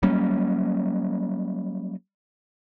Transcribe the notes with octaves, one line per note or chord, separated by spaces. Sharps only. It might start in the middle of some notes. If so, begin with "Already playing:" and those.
F#3 G3 A#3 C#4